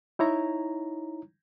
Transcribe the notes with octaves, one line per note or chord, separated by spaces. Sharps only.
D#4 E4 C#5 A#5